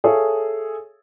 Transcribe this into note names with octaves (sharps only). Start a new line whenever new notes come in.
G#4 A4 C#5 E5 F5